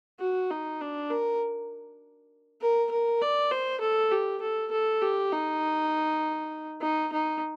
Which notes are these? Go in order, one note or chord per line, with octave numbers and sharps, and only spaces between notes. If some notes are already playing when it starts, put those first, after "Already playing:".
F#4
D#4
D4
A#4
A#4
A#4
D5
C5
A4
G4
A4
A4
G4
D#4
D#4
D#4